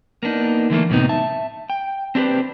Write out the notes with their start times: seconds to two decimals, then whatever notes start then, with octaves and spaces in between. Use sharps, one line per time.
0.23 A#3 B3 D4 D#4
0.70 D3 E3 A3 A#3
0.90 F#2 A2 C3 B3 D#4
1.09 E5 A5
1.70 G5
2.15 C4 D4 G4 B4 C5